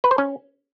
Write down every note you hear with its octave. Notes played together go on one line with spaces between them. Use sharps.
B4
C5
C#4